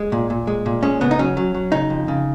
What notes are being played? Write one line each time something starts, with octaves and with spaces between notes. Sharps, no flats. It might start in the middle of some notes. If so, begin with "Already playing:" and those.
Already playing: G#3
A#2
A#2
G#3
A#2
G#3 C#4
C#3 B3
D#4
F#3 C#4
F#3
F#3
C#3 D#4
F2
C#3